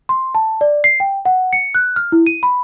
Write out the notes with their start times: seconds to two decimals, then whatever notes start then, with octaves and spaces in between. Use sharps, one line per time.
0.09 C6
0.35 A5
0.61 D5
0.84 C7
1.00 G5
1.25 F#5
1.53 C#7
1.75 F#6
1.96 F6
2.12 E4
2.27 D#7
2.43 B5